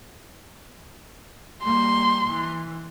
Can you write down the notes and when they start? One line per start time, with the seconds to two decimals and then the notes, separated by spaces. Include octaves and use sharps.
1.63 G3 A#3 C6
2.28 E3